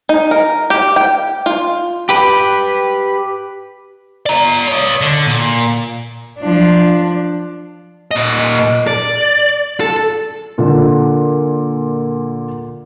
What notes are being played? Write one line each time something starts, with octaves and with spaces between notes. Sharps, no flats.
D#4
A#4
G4
G5
F4
G4 B4
D5 A#5
C#5 D#5
D3
A#2
F3 D4
A#2 D#5
D5
A4
A#2 D3